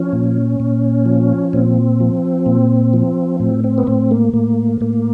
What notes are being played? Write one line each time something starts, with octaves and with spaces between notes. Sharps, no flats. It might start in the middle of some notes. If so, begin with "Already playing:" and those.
Already playing: F3 C#4
A#2
A#2
F3
A#2 C4
F3
A#2
F3
A2 C4
C4
B3
A2 C4
A#3
A2 A#3
A2 A#3